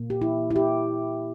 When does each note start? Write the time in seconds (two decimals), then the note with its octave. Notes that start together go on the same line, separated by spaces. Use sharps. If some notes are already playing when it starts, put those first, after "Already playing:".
Already playing: A#2 A#3
0.10 G4
0.22 E4
0.51 E4
0.56 G4